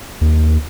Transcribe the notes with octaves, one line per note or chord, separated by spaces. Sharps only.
D#2